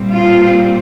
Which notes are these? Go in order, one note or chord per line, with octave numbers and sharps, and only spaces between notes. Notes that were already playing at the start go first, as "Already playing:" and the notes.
Already playing: A#2 G3 C4
F4